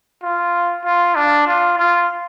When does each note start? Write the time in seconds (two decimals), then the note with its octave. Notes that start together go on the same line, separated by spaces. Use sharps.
0.23 F4
0.84 F4
1.16 D4
1.46 F4
1.77 F4